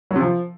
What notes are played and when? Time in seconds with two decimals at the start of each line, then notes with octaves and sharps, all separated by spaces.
0.11 F#3
0.16 C3
0.21 F3